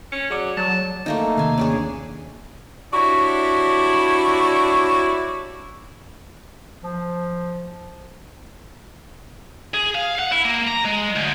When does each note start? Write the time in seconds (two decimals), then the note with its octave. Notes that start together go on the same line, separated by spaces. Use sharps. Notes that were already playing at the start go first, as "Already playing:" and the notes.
0.12 C#4 C#7
0.30 F#3 G#4 D5 D6
0.57 F#3 A5
1.06 A3 A#3 D#4
1.37 D#2 C3 F5 G#5
1.58 C#4 D4 G#4
2.93 D4 E4 F#4 G4 C#5 D5
6.84 F3
9.74 G#4
9.95 F5
10.19 F#5
10.32 E4
10.45 A#3
10.67 A#5
10.85 G#3
11.16 D2